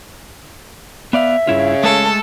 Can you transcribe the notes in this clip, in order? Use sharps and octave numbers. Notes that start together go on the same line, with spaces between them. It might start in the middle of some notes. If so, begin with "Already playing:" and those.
B3 D5 E5 F5
G2 C#3 E4 F4
G#3 A3 G#4 A4